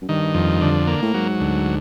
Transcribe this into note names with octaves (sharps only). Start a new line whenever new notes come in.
F#2
G2 D#3
F2
D3
A#3
A2
G#2 F#3
D2